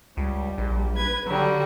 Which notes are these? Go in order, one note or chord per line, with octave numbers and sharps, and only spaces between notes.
C#2 G3
A#1
B4 G#6
D3 F#3 G3 F#4